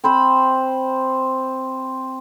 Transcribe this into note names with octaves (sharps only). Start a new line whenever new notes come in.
C4 C5 B5